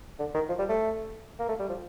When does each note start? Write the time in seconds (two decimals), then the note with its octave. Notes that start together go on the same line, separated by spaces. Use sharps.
0.19 D3
0.34 D#3
0.49 F3
0.59 G3
0.69 A3
1.40 A#3
1.49 A3
1.59 G3
1.69 F3